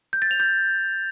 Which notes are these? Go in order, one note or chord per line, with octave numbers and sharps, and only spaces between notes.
G6
A6
F7
G6